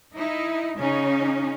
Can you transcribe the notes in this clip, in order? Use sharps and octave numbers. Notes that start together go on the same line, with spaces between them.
D#4 E4
C#3 C#4 D#4